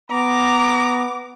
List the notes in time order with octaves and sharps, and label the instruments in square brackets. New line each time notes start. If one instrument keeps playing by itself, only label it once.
[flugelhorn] B3 [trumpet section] A#5 [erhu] D6